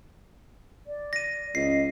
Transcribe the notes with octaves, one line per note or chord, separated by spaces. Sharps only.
D5
A#6 D#7
C#2 D#5 C7